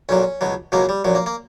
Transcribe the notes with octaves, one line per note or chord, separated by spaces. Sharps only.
B1 A#2 F#3 C#4
C#2 B2 F#3
C#2 B2 F#3 A#3
G3
A#1 A#2 F#3
A#3
A#3